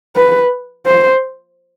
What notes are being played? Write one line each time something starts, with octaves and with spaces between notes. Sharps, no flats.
B4
C5